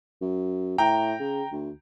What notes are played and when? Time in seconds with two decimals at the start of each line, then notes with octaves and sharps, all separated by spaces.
0.21 F#2
0.78 A2 G5 A#5
1.20 C#3
1.52 D2